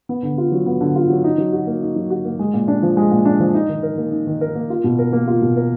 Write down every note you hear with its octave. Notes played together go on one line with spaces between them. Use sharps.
B3
D3
F4
F#3
B3
D3
F4
F#3
D#4
F#3
F#4
A#3
D#4
F#3
F#4
A#3
G#3
A#2
D4
F3
G#3
A#2
D4
F3
D#4
D#3
A#4
A#3
D#4
D#3
A#4
A#3
F4
B2
A#4
A#3
F4
B2
A#4